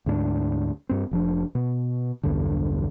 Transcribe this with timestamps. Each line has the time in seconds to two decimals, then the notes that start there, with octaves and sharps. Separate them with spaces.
0.06 D2 G#2 C4 D4
0.89 G2 C4
1.11 F1 F3 D4
1.55 B2
2.23 B1 E2 G2 D3